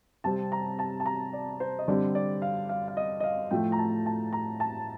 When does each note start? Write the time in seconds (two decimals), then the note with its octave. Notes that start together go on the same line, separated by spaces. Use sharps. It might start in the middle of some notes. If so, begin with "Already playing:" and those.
0.24 C3 G3 C4 A5
0.52 A#5
0.79 A5
1.00 A5
1.06 A#5
1.33 D5
1.60 C5
1.79 D#5
1.88 D3 G3 C4 D5
2.15 D5
2.42 F5
2.69 F5
2.88 F5
2.97 D#5
3.20 D#5
3.24 F5
3.51 A2 F3 A3 G5
3.72 A#5
3.78 A5
4.06 A5
4.33 A#5
4.60 A5